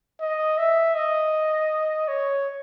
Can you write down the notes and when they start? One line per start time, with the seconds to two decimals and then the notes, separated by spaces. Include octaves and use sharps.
0.21 D#5
0.58 E5
0.95 D#5
2.08 C#5